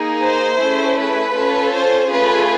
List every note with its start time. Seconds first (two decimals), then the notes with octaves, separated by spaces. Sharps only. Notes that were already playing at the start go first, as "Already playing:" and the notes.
Already playing: A#3 D#4 G#4
0.22 C5
0.60 A3 C#4 E4 G#4
0.98 B4
1.34 C#4 F4 A4
1.73 C5
2.10 A3 C#4 F4 G#4 B4